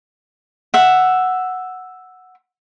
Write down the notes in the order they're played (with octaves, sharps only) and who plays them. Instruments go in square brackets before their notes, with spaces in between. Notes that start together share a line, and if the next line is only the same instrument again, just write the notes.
[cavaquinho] E5 F#5